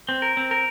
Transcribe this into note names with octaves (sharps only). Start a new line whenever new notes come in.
C4
A#4
C4
A#4